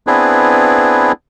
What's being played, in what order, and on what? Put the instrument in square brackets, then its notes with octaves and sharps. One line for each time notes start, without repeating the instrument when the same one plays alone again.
[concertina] B3 C4 D4 E4 G#4 B4